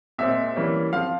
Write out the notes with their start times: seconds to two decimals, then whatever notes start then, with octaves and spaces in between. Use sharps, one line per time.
0.19 A#2 G#3 C4 E5
0.56 E3 G3 A#3 C#4
0.92 F3 C4 F5